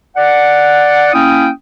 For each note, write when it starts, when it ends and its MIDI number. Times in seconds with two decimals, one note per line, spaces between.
0.16 1.10 74
0.16 1.10 78
1.13 1.48 58
1.13 1.48 61
1.13 1.48 64
1.13 1.48 79
1.13 1.48 87